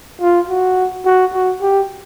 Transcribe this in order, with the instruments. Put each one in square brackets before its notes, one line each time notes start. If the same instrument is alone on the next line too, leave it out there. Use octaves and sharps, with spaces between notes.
[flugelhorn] F4
F#4
F#4
F#4
G4